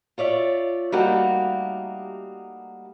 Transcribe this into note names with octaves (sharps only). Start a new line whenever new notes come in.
F4 C#5 D5 E5
G3 A3 A#3 D#4 F#4 G4